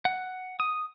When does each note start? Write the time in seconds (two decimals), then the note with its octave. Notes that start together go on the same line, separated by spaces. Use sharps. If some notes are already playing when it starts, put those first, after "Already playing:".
0.05 F#5
0.60 D#6